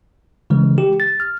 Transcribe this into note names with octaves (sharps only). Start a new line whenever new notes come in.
C#3 E3 G#3
G4
A6
F6